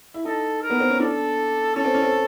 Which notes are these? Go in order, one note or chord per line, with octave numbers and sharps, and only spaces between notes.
E4
D#4 A4
A#4
B3
C4
C#4
D4 A4
C#4 A4
C4
C#4
C4